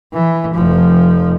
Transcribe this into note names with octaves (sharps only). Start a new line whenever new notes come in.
E3
F1 F3